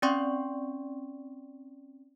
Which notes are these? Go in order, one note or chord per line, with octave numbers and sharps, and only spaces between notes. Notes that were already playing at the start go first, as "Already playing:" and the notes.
C4 C#4 D5 G5 C6 C#6